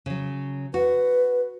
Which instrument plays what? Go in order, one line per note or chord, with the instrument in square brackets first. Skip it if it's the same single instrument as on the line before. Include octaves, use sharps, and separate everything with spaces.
[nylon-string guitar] C#3 F#3
[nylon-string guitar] F#4 [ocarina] B4